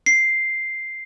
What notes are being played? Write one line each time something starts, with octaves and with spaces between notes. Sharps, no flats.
C7